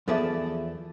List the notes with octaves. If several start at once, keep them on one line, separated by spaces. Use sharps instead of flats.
E2 F3 G#4 A4 D5 E5